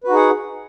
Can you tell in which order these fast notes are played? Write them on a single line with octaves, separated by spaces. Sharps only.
B4 F#4 D#4 G#4 F#5